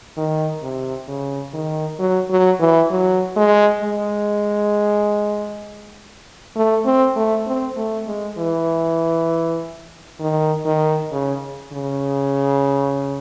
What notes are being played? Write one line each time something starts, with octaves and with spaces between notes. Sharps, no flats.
D#3
C3
C#3
D#3
F#3
F#3
E3
F#3
G#3
G#3
A3
C4
A3
C4
A3
G#3
E3
D#3
D#3
C#3
C#3